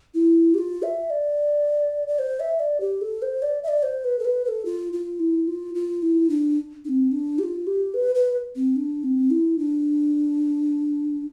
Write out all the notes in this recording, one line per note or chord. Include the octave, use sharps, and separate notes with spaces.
E4
G4
F4
E5
D5
D5
C5
E5
D5
G4
A4
C5
D5
E5
D5
C5
B4
A4
B4
B4
A4
F4
F4
E4
F4
F4
E4
D4
D4
C4
D4
G4
F4
G4
B4
B4
C4
D4
C4
E4
D4